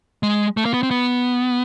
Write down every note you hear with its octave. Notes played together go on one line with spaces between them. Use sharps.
G#3
A3
A#3
B3
C4
B3